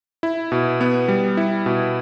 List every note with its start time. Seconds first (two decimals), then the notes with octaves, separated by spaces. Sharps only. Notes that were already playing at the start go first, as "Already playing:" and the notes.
0.23 E4
0.52 B2
0.81 B3
1.08 G3
1.37 E4
1.66 B2